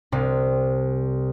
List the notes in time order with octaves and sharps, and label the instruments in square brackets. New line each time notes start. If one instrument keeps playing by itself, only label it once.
[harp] C2 C3